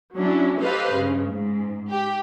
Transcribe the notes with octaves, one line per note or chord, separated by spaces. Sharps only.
F#3 C#4 D4 E4
G4 A4 B4 C5 D#5 F5
G2 C#3
G#2
G4